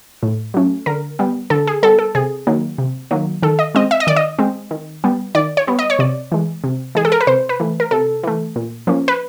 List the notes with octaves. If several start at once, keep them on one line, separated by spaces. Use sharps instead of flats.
A2
F#3 A3 C#4
D3 A#4
G3 B3
D3 A4
G#4
G3 B3 A4
A4
C3 G#4
D#3 F#3 A#3
C3
D#3 F#3 A#3
D#3 A4
D#5
G#3 C4 D#5
E5
D#5
D#3 D5
D#5
G#3 C4
D#3
G3 B3
D#3 D5
C#5
G3 B3
D#5
C#5
C3 D5
E3 G#3
C3
E3 G#3 G#4
A4
A#4
B4
C3 C5
B4
E3 A3
A#4
C3 A4
E3 A3
A#2
F3 A#3 C#4
B4